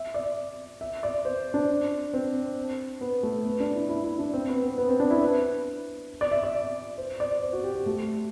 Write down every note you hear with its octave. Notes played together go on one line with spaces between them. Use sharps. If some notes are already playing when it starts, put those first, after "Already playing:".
Already playing: E5
D5
E5
D5
C5
D4
C4
B3
A3
B3
D4
E4
E4
E4
D4
C4
B3
B3
B3
C4
D4
E4
B4
D5
E5
D5
C5
D5
C5
F#4
G4
G4
A3